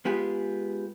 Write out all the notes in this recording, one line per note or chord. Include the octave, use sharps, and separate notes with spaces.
G#3 B3 F4 G4 G#4